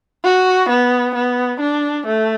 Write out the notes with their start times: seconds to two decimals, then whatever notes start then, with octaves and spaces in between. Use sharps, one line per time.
0.24 F#4
0.69 B3
1.15 B3
1.60 D4
2.06 A3